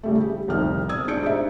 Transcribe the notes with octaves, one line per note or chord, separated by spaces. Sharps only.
C#3 G3 A3
G4
F1 C2 D#3 G5 F6
D#6 E6 G#6
G#3 D4 G6 C#7 D7
D4 D#4 G4 C5 E5